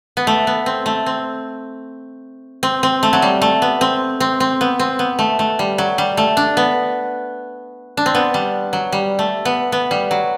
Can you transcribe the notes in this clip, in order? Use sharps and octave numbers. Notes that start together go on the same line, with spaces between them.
B3
A3
B3
C4
A3
C4
C4
C4
A3
F#3
G3
A3
B3
C4
C4
C4
B3
C4
B3
A3
A3
G3
F#3
G3
A3
D4
B3
D4
C4
B3
G3
F#3
G3
A3
B3
B3
G3
F#3